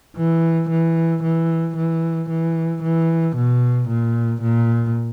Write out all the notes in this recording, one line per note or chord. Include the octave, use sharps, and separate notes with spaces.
E3
E3
E3
E3
E3
E3
B2
A#2
A#2